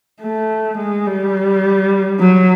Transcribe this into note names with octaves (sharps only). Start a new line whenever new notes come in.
A3
G#3
G3
F#3